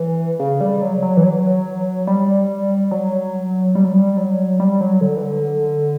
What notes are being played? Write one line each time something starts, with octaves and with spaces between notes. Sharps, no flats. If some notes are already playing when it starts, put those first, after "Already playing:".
Already playing: E3
C#3
G3
F#3
F#3
E3
F#3
G3
F#3
G3
F#3
G3
F#3
G3
F#3
D3
E3
D3